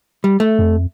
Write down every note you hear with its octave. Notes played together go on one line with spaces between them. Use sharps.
G3
A3
F2